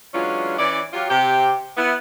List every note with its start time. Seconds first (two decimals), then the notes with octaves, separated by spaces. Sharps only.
0.14 E3 F#3 G#3 C#4 D4 F4
0.58 E3 C#4 E4 D5
0.93 F#3 F4 G4
1.09 C3 G4
1.77 B3 E4